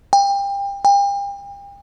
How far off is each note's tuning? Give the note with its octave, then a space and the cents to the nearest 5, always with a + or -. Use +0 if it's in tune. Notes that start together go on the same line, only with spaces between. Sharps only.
G5 +30
G5 +40